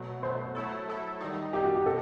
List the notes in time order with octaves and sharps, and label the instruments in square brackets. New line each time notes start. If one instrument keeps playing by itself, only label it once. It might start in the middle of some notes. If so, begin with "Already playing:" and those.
Already playing: [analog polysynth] B2 F#3 A3
[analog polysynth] B2 F#3 A3 [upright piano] C5
[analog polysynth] F#3 A3 E4 A4
F#3 A3 E4 A4
D#3 G3 D#4
[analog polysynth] D#3 G3 D#4 [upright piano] G4
[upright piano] F#4
G4
[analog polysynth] B2 [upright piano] A4